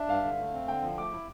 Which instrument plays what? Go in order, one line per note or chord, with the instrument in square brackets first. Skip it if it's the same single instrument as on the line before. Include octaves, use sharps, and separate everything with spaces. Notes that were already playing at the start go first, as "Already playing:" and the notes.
Already playing: [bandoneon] D4 [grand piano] E5
[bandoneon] G2 [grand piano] F5
[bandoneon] D3
A3
C4
[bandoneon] D3 [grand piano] G5
[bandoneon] F3
[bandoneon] A3 [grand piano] D6
[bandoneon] E4